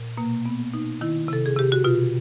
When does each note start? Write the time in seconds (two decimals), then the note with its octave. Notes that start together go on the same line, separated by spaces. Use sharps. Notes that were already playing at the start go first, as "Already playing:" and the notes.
Already playing: A#2
0.18 B2 A#3
0.45 B2 B3
0.73 B2 D#4
1.01 D#3 E4
1.28 C3 A4
1.46 G#4
1.57 C3 G4
1.72 F#4
1.84 B2 F4